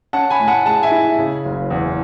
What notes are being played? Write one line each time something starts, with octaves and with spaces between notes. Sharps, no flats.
C#4 F#5 A5
G#5 B5
A2
F#5 A5
G#3 F#5 A5
E5 G#5
E4
C#3
F#1
E2